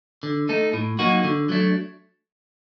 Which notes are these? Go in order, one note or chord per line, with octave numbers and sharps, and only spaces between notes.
D3
A3 D#4 A4
A2
F#3 A#3 D#4 F#4
D3
F#3 A3 D4